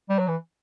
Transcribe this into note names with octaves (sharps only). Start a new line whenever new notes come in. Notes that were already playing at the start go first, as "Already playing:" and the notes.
G3
F#3
E3